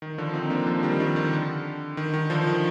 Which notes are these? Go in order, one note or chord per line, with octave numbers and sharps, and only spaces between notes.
D#3
D3 F3
C4 D#4
A#3 D4
D3 F3
D#3 G3
D#3
D#3
D3
D#3
D#3
D3 F3
D#3